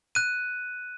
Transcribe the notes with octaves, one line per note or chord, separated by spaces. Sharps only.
F#6 D#7